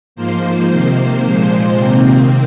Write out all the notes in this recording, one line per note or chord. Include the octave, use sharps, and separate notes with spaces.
G#2 F3 A#3 C5
C3 D#3 A#3
A#2 F3 G#3 C5
C3 D#3 A#3 C4